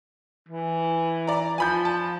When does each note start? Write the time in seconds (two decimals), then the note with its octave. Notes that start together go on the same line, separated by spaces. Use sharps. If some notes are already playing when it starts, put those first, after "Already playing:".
0.49 E3
1.27 D5 A#5
1.58 F3 G#5 B5 G6
1.85 A5